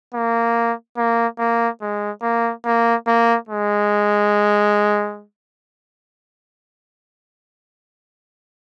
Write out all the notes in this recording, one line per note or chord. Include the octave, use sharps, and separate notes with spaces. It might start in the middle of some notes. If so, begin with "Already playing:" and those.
A#3
A#3
A#3
G#3
A#3
A#3
A#3
G#3